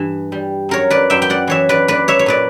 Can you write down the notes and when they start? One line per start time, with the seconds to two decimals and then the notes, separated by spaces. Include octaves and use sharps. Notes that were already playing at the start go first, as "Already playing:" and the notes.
Already playing: G2 E3
0.32 G3
0.69 F#2 A#4 C#5
0.90 B4 D5
1.10 F#2 E5 G5
1.22 G5
1.30 D5 F#5
1.47 E3 C#5 E5
1.69 B4 D5
1.88 A#3 B4 D5
2.08 C#5 E5
2.19 C#5
2.26 A#2 B4 D5